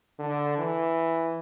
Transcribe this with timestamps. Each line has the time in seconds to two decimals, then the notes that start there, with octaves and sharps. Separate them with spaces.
0.19 D3
0.58 E3